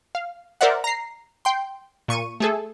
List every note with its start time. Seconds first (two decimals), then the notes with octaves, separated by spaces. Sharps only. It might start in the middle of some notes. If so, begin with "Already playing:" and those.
0.15 F5
0.61 A#4 C5 D5 E5 F#5
0.84 A#5 C7
1.45 G5 C6
2.08 A#2 C#6 D#7
2.40 A3 G#4 A4